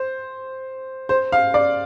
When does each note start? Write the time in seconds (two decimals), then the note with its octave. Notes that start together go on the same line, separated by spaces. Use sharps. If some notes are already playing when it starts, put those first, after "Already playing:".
Already playing: C5
1.09 C5
1.32 F5
1.54 D5